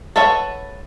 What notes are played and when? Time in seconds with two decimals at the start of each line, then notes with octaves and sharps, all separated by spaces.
0.16 A4 B4 C#5 E5 F#5